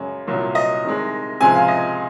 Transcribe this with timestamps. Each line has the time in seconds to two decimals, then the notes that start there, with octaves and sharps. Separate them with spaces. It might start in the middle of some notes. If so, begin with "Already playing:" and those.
Already playing: F#2 C#3 G#3 C#5
0.27 C2 A#2 F#3
0.55 D#5
0.84 C2 C3 D#3 G#3
1.40 C#2 C3 F3 G#3 G#5
1.55 F5
1.68 D#5